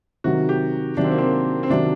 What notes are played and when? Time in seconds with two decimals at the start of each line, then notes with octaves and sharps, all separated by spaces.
0.24 C3 D#3 F#3 F#4
0.49 G4
0.97 C3 D#3 F#3 D4
1.04 C4
1.12 A#3
1.18 C4
1.63 C4
1.70 C3 D#3 F#3 D4